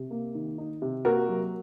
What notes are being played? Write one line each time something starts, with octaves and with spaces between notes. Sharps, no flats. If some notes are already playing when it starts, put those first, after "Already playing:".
Already playing: C3
A#3
D#3
D#4
C3
A#3 F#4 A#4
F#3